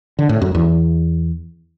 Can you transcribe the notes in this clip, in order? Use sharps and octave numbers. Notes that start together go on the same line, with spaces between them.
D3
A2
F#2
E2